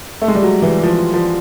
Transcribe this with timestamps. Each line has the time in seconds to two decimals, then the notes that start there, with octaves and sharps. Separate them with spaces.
0.22 A3
0.28 G#3
0.35 G3
0.43 F#3
0.62 E3
0.83 F3
1.14 F3